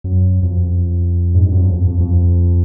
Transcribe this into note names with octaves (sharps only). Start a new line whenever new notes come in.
F#2
F2
G#2
G2
F#2
F2
F2
F2
F2